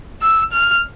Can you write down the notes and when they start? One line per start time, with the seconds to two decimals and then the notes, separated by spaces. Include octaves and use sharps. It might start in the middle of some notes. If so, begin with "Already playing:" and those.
0.22 E6
0.52 F6